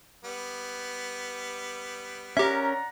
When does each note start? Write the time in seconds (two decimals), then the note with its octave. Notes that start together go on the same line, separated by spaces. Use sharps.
0.24 G3 B3
2.37 C#4 G4 A#4 D5 E5 F#5 A#5